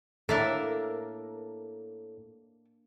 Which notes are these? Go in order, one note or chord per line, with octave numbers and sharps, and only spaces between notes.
A2 A#3 D4 A4 A#4 E5